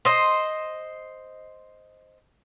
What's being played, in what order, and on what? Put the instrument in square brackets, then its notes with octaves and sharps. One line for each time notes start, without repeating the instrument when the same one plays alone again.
[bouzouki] C5 D#5